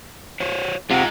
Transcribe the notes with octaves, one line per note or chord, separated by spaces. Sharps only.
F#4 C5 C#5
C3 G#3 D#4 F4 F#5 G5